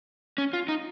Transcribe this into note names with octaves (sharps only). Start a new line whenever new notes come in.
C#4
F4
D#4